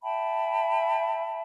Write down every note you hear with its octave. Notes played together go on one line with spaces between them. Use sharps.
E5 G5 A5 B5